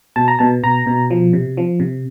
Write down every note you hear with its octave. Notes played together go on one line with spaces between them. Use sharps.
B2 A5
A#5
B2 A5
B2 A#5
B2
F3
C3
F3
C3